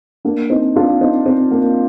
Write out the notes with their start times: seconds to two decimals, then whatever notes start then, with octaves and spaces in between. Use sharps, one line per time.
0.25 A#3 D4
0.50 C4 D#4
0.76 D4 F4
1.01 C4 D#4
1.26 C4
1.51 A#3